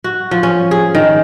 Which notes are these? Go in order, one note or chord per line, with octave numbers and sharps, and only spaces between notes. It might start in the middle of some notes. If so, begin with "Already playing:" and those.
F#4
F3
C#4
G#4
D#3